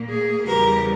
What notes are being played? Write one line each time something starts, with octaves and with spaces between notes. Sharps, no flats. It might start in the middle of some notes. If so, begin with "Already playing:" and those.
Already playing: A#2 A#3
G#4
E2 C#3 G3 G4 A#4